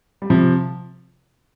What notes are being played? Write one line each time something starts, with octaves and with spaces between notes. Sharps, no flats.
G3
C3 F3